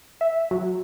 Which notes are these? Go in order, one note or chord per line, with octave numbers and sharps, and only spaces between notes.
E5
F#3